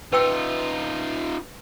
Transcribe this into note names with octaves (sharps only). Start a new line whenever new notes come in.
D#4 F4 B4 G5 E6